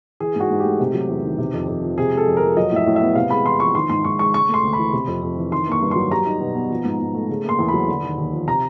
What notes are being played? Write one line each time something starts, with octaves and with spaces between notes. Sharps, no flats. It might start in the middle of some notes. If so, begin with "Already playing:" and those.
E3 G#4
G#2 F#4
G#2
A3 G4
C3
F#3
E2
D#3
C3
F2
F2
F3
C3 G#4
G#3 A4
F2
A#4
F3
F#3 D#5
A2 E5
A2
B3 E5
C3 F5
G#3 B5
E2 C6
F3 C#6
D#3 C6
G#2 C6
G#2 C#6
G#3 C#6
C#3 C#6
A3
C6
D2
B5
E3
C3
F2
F2
E3
D#3 C6
A#3 C#6
G2
F#3 C6
G3 A#5
D#4
B2
B3
F3
G#2
G#2
A3
C#3
A#3 C6
E2
B5
F#3
D3
D#2
D#2
F3
C3 A#5